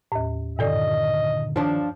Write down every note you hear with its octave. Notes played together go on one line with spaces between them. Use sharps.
D#2 A2
G2 A#2 D3 D#3 A4 D5 D#5
D#3 F3 D4